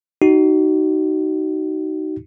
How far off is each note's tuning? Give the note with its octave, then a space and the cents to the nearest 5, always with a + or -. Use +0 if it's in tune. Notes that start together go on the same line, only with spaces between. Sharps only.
D#4 +0 F#4 +35